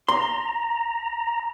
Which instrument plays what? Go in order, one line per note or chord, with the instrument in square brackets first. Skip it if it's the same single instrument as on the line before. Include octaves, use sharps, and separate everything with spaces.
[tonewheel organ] A#5 [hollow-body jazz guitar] C6